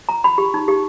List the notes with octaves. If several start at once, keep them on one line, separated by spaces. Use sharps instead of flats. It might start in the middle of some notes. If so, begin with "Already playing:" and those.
A#5
B5
G4
D#4
G4